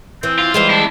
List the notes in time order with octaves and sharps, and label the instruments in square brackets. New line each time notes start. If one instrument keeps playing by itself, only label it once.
[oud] E3 [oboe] C4
[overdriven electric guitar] F4
[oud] E3 G3 G#3 [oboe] C5
[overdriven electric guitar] D4 E4